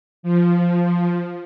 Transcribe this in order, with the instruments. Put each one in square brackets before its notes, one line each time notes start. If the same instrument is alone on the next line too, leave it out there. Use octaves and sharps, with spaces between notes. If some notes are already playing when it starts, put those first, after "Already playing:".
[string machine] F3